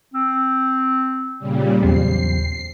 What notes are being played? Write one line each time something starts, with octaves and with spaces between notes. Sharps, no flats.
C4
A#2 C#3 G3
E2 F#3 B3 C5 C7